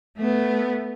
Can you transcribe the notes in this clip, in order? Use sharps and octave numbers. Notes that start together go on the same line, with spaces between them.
A3 B3